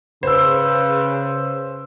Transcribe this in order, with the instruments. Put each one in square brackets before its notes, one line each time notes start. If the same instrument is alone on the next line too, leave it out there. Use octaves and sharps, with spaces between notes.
[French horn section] C#3 [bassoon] B4 [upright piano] C5 E6